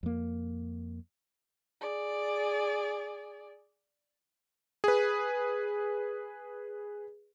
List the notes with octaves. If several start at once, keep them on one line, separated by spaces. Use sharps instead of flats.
F2 A#3
G#4 D5
G#4 B4